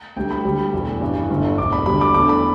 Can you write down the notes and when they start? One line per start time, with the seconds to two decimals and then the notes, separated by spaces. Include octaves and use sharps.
0.16 D2 D3 G3 G5
0.31 B5
0.45 D2 D3 G3
0.74 E2 B2 A3
1.01 A1 G2 E3
1.30 G1 G2 D3 A3
1.58 E1 D2 D3 D6
1.73 B5
1.86 D2 D3 G3 B5
2.01 D6
2.14 E2 D3 A3 D6
2.29 B5